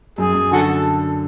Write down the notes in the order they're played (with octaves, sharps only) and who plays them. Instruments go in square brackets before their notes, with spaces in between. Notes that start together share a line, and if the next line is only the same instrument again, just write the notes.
[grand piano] F#2 [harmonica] G#4
[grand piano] F#2
[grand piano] D3 [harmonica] F#4 A4